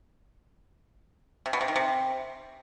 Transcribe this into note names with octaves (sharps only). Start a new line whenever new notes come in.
C3
B2
C3
D#3
C3